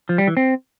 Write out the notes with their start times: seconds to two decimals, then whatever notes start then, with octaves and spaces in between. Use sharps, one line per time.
0.09 F3
0.18 G3
0.27 E3
0.37 C4